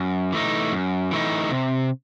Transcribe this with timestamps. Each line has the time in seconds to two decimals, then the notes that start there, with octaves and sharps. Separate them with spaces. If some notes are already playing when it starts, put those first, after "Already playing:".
Already playing: F#2
0.32 E3 A3 D#4
0.72 F#2
1.11 E3 A3 D#4
1.50 C3